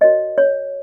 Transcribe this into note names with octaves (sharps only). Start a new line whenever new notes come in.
F#4 A#4 C#5 D#5
C#5